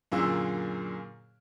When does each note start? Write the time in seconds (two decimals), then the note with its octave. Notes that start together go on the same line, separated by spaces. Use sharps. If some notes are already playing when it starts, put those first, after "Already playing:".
0.12 F#2 A#2 D3 A#3 G#4 E6